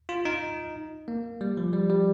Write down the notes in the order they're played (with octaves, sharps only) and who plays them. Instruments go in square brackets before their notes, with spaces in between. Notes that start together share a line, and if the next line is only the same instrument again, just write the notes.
[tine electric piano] F4
D#4
A#3
G3
F3
G3
G3